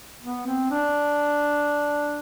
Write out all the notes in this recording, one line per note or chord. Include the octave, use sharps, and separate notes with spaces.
B3
C4
D4